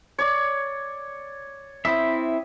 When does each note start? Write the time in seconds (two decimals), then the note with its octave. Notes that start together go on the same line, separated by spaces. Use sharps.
0.18 C#5 D5
1.85 C4 E4 E5 D#6